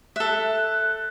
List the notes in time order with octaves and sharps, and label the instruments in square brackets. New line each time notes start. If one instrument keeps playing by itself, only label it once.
[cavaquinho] A4 E5 [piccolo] F#6